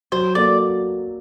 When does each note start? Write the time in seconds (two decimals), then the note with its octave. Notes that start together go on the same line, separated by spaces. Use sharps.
0.12 F#3 C5
0.35 A#3 F#4 A4 D5